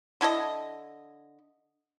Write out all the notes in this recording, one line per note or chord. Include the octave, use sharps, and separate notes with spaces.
D3 E4 A4 D#5